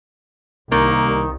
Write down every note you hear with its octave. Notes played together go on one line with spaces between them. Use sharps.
C2 D#3 A#3